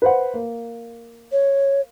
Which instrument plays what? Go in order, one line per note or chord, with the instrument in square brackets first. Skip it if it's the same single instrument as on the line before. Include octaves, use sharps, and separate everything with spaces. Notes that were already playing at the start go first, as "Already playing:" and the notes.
[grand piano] B4 C5 F#5
A#3
[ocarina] C#5